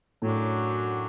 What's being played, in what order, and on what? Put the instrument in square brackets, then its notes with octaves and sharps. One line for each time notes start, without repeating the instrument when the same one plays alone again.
[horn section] F#2 F#3 D4 F#4 [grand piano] A2